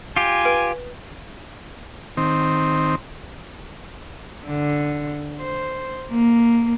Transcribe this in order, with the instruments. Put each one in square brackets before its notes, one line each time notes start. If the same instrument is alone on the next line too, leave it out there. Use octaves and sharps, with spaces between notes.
[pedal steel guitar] F4 G4 [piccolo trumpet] G#5
[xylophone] B4 D7
[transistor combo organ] D#3 C4
[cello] D3
C5
A#3